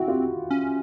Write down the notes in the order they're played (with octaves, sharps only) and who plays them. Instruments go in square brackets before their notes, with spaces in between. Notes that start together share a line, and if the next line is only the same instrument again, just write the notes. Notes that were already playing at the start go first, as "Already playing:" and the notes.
Already playing: [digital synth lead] C4 [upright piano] E4 F#4
[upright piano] F4 G4
[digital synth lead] C#4